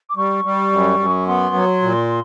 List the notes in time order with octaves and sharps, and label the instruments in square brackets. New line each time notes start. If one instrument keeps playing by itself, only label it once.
[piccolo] D6
[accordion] G3 [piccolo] C#6
[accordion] G3
F#2
F#2
[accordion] B3 [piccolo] C6
[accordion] F#3
A#2